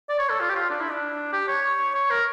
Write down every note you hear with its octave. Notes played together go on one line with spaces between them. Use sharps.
D5
C#5
A4
F4
G4
F4
D4
E4
D4
G4
C#5
C#5
A#4